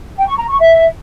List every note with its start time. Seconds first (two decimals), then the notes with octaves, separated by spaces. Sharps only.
0.17 G5
0.27 C#6
0.37 A#5
0.48 C#6
0.58 E5